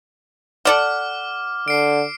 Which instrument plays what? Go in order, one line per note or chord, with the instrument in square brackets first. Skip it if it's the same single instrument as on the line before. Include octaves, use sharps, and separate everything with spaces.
[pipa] A4 D5 F#5 [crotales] D6 F6
[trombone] D3 [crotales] C7 D7